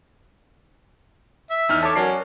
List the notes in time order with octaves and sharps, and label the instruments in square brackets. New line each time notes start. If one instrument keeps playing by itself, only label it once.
[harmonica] E5
[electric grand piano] E2 D#4 F6
[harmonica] A4 C#5 [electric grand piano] A5 D6
[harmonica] F#3 C#4 [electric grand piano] A#4 D5 C7